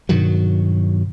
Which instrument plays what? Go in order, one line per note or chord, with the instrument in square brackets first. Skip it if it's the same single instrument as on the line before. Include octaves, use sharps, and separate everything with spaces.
[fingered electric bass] G2 B2 D#3 F#3